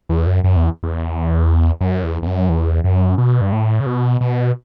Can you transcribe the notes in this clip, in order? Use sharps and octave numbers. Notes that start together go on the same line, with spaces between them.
E2
F#2
F#2
E2
E2
F#2
E2
E2
F#2
E2
F#2
B2
G2
A2
C#3
B2
B2